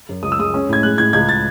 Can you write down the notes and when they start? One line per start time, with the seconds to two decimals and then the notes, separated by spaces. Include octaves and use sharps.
0.09 F#2
0.23 C#2 D#6
0.32 E6
0.39 G#3 D#6
0.54 C#4
0.69 A2 G#6
0.83 G#3 F#6
0.98 A2 G#6
1.13 C#2 G#6
1.29 A6